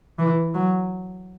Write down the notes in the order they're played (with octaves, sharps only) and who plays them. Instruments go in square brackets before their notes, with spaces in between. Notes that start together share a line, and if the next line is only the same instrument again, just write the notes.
[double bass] E3
F#3